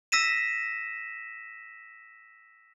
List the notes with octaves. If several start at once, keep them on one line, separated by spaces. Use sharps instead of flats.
E6 A#6 B6 D#7 E7